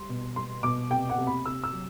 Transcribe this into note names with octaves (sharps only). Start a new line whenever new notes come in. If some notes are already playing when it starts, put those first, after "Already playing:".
Already playing: G3 C6
B2
G3 C6
B2 D6
C3 G5
F#5
C3
B5
C3 E6
E6
F#3